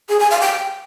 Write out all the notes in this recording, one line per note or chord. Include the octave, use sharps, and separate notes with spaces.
G#4
G#5
F5
G5